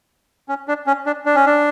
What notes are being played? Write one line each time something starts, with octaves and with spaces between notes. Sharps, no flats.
C#4
D4
C#4
D4
D4
C#4
D4